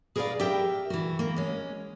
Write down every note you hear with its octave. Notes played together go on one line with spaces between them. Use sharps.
G#4 A#4 B4 C#5 D5 F5
G4 A#4 E5 G5
E3 F#4
A#3
G#3 C#4